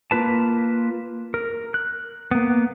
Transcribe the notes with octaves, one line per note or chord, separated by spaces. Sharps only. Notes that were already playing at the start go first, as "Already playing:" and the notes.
A#3 F4 B4 A5
A#4
F#6
A#3 B3